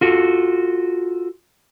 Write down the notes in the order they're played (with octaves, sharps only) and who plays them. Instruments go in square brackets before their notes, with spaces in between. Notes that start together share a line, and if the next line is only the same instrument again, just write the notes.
[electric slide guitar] F4 F#4 A4